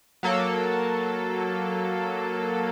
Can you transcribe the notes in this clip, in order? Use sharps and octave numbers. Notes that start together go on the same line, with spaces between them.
F#3 A#3 A4